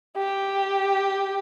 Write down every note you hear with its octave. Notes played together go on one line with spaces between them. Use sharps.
G4